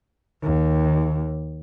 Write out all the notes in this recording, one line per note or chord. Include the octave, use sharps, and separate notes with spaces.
D#2